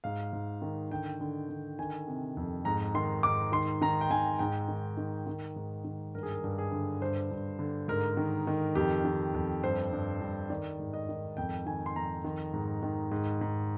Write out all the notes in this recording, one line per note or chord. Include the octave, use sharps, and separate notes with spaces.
G#2 F5
G#2
D#3
D3 G5
D3
D3
D#3 G#5
C3
F2
G#2 A#5
D#3 C6
G#2 D6
D#3 C6
D#3 A#5
G5
D#3 G#5
G#2 G5
D#3
D#3
D#3
G#2
D#3
G2 A#4
G#4
A#4
G2
G#4
D3
G2 C5
G2
D3
G#2 A#4
D#3
D#3
F2 G4
D#3
F2
G2 C5
G2
G2
D#3 D5
G#2
D#5
D#3
F2 G5
D#3 G#5
C6
F2 A#5
D#3
G#2
D#3
G#2
G#2